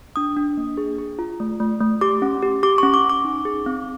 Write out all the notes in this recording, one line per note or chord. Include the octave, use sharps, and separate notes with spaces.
D4 D#6
D4
A#3
G#4
G#4
F4
A3
A3
A3
G4 D6
C#4
G4
G4 D6
C#4 C#6
D6
C#4
D6
D#4
G#4
C4